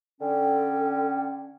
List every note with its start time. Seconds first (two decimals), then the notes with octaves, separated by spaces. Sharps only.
0.21 D3 C#4 A4 G5